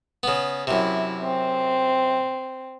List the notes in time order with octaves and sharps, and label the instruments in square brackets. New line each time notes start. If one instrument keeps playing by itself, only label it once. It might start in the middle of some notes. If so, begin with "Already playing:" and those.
[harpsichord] C#3 B3
[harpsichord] F#2 C3 [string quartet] E4
[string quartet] C4